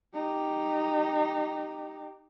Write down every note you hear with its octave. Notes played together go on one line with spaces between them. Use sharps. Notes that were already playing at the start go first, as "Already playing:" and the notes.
D#4 G4